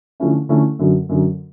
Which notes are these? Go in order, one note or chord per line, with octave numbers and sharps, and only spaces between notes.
D3 F3 A3 C#4 E4
D3 F3 A3 C#4 E4
F#2 D3 F#3
F#2 D3 F#3